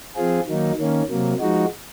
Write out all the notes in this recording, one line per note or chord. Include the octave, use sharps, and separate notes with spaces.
F3 C4 F4 G#4
D#3 F#3 A#3 D#4
D#3 A#3 C#4
C3 F#3 A#3
F3 G#3 D#4 F#4